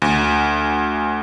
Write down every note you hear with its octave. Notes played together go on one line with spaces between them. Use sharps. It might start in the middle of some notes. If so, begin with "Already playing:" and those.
D2